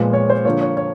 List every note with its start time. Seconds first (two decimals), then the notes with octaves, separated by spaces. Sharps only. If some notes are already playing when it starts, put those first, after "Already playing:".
Already playing: A#2 F3 G#3 B3
0.13 C#5
0.30 C5
0.45 D3 F3 A#3 C#5
0.61 C#5
0.77 C#5